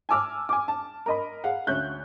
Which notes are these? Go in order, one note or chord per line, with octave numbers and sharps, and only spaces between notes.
G#5 A5 D6 E6 F6
G#5 D6
A5
A#4 D#5 B5
G#4 F5 F#5
D2 C#4 C#5 E5 F#6 G6